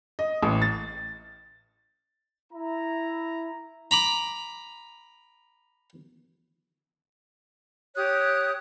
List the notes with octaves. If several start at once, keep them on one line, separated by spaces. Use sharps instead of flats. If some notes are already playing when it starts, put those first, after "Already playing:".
D#5
A1
A6
E4 A#5
A#5 B5 D6
G4 C#5 D#6 F#6